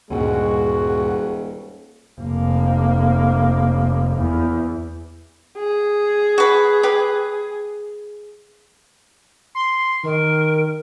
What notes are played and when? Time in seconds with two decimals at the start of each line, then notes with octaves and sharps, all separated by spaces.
0.10 D#1 D2 G2 A#2 G#3 F#4
2.21 F1 A#3
4.18 E2
5.57 G#4
6.38 F#4 B4
6.83 G4 B4
9.55 C6
10.04 D#3 A#4